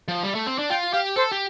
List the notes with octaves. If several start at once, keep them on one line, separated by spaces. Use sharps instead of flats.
F3
G3
A3
C4
D4
F4 G5
G4 F5
A4 C5
G4